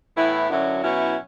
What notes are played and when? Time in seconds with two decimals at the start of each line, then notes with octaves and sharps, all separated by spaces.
0.16 A2 E3 B3 E4
0.49 F#2 D3 F#3 C#4 E4
0.82 B2 F#3 C#4 E4